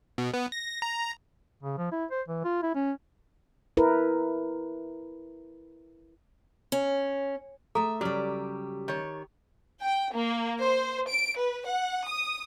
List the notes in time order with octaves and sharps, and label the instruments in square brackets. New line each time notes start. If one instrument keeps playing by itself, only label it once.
[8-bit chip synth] B2
B3
A#6
A#5
[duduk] C#3
F3
E4
C5
E3
F4
E4
C#4
[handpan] E4 A#4 B4
[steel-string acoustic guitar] C#4
[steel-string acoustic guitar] A3 E5 [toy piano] G#4 A4 A#5
[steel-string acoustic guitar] C#3 G3 [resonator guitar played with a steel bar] F#3 D5 [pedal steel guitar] G4 F6
[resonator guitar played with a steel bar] D#3 C#5
[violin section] G5
A#3
C5
D7
B4
F#5
D#6